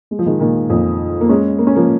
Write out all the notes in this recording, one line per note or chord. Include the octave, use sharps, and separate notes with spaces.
G#3
F3
D#3 G#3
A#2 D#3
F2 A#2
A#3
G#3 C#4
A#3
C#4
F3 A#3